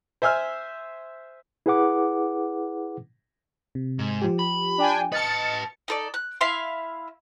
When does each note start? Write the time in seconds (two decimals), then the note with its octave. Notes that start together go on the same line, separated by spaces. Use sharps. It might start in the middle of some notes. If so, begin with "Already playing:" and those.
0.22 C5 E5 G#5 E6 F6
1.66 E4 G#4 B4 F#5 D6
3.75 C3
3.99 G#2
4.22 F3 G4
4.39 B5
4.78 D4 G5 G#5
5.12 B4 D#5 A5 F6 A6 C#7
5.88 D#4 A4 D5
6.14 F#6
6.41 E4 E5 F5 C6